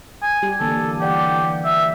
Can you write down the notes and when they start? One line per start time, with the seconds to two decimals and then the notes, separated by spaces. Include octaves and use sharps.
0.22 G#5
0.42 G3 G4
0.60 D3 E3 A#3 A4
1.00 E3 G4 D5 F#5
1.64 E5